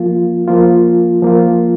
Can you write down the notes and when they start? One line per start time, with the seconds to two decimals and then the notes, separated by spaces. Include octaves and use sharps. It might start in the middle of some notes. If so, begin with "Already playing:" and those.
Already playing: F3 A#3 F4
0.48 F3 A#3 F4
1.22 F3 A#3 F4